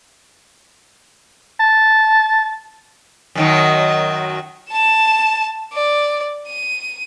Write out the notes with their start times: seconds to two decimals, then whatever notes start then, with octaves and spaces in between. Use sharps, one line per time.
1.60 A5
3.35 F#2 D#3 F#3
4.71 A5 E7
5.73 D5
6.48 D#7